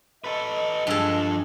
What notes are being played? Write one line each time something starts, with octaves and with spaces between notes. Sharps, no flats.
A4 B4 D#5
G2 F3 G#3 A4